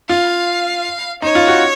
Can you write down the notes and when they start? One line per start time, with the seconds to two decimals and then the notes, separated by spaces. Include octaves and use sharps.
0.09 F4 F5
1.22 D#4 C#5
1.35 F4
1.48 F#4